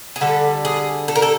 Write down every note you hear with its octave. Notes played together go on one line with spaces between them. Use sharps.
G#4
D3 G3 A4
G#4
A4
A#4
A4